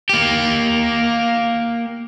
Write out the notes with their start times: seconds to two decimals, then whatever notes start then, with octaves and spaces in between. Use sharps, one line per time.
0.09 A#3 G4